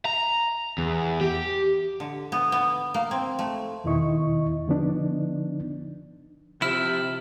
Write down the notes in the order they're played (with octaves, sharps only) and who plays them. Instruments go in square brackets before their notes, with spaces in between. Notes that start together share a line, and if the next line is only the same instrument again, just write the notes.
[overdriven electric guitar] A#5
E2
G4
[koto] D3
B3
B3
A#3
C4
A3
[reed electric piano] E2 B2 D#3 E4 D#5 C#6
D3 F3 B3 D4 D#4
[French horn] C3 [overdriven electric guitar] F3 [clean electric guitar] E4 [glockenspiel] F6